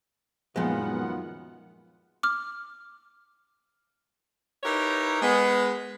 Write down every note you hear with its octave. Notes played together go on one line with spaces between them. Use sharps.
F#2 A#2 D#3 F3 G#3 B3 F4 F#5
D6 F6
D#4 E4 G4 A#4 B4 C#5
G#3 B3